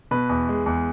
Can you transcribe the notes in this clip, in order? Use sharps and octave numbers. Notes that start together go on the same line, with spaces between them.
B2 B4
E2
G#3
E2